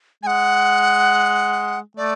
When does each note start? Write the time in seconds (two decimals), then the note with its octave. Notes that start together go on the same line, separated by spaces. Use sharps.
0.23 G#3 F#5 G#5
1.97 A3 D5